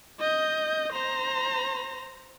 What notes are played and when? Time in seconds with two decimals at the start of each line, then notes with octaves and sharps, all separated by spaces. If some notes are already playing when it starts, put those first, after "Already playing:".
0.20 D#5 G6
0.93 C5 A#5